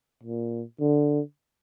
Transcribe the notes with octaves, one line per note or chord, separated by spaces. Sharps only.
A#2
D3